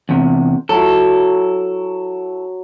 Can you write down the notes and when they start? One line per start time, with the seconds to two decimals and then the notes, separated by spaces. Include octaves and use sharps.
0.09 E2 C3
0.69 F#3 E4 A4